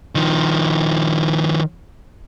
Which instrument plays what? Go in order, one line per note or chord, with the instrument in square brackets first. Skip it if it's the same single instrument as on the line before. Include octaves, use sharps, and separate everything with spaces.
[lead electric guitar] D#3 F3